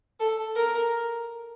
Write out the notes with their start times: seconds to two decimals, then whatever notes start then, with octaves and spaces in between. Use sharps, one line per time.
0.20 A4
0.56 A#4